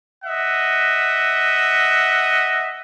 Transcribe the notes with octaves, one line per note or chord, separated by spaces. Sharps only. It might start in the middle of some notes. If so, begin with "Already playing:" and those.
D#5 E5 F#5